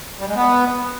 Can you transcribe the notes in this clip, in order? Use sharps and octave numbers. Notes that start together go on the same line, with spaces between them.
G3
G#3
B3